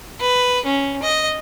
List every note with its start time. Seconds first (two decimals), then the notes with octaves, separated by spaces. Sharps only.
0.20 B4
0.66 C#4
1.02 D#5